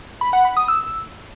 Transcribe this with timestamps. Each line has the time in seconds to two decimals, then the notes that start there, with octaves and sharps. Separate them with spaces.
0.21 B5
0.33 F#5
0.45 B5
0.57 D#6
0.68 E6